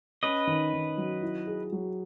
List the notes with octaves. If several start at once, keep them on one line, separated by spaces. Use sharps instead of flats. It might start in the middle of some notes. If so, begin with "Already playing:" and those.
C#4 B4 D#5
D#3
D#3
F#3
E4
G#4
F#3